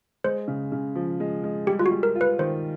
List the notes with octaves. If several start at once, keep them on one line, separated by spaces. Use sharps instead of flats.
G#3 C5
C#3
C#3
F3
G#3
G#3
G3 G4
F4
F#4
G3
A#4
F4
B4
D#3 C5